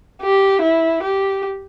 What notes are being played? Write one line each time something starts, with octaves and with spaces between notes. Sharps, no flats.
G4
E4
G4